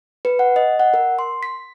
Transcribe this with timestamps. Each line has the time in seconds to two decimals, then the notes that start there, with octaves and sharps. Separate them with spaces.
0.25 B4
0.39 F#5
0.56 D#5
0.80 F#5
0.94 A#4
1.19 C6
1.43 B6